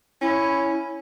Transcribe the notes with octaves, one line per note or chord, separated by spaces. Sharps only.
C#4 E4